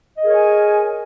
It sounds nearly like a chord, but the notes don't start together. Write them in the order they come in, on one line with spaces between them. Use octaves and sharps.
D#5 G#4 A#4 C#5 G#5